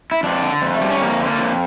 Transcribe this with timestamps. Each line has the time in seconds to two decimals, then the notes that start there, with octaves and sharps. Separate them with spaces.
0.12 E4
0.23 F2 D4
0.42 D3
0.62 F2
0.75 A3
0.81 G3
0.90 C#4
1.00 F2 A#3
1.20 D3
1.26 A#3
1.39 F2